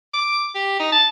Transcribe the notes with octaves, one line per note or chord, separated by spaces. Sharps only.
D6
G4
D#4
A5